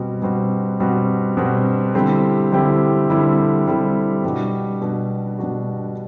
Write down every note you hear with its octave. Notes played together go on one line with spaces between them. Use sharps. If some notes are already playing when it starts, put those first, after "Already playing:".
Already playing: B2 G3 C4 F#4
B2 G3 C4 F#4
B2 G3 C4 F#4
B2 G3 C4 F#4
D3 G3 C4 E4 G4
D3 G3 C4 E4 G4
D3 G3 C4 E4 G4
D3 G3 C4 E4 G4
B2 G3 D4 F#4
B2 G3 D4 F#4
B2 G3 D4 F#4